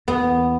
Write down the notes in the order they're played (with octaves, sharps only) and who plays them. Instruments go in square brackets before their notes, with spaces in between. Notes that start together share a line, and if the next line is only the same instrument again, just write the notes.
[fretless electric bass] E2 [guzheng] B3